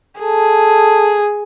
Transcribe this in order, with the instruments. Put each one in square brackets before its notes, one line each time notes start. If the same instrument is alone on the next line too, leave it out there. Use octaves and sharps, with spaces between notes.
[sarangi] G#4 [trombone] A4